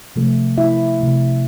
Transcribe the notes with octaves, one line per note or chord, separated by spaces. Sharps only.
C3 F3 A3
E4 E5
C3 F3 A3